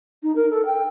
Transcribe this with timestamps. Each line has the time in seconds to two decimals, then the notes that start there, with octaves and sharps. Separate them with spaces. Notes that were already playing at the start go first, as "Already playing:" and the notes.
0.23 D#4
0.36 A#4
0.50 A4
0.66 G5